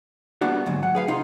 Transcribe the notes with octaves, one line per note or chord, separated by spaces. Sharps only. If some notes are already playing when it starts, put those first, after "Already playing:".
G3 A#3 B3 D4 F#4
D2 G#2 F#3
F#5
G#4 B4 F5
C3 D#4 F4